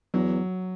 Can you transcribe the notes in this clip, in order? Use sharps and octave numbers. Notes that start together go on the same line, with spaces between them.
E2 F#3